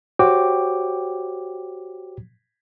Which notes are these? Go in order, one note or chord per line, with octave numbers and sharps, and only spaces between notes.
F#4 G4 C5 C#5 G5 D6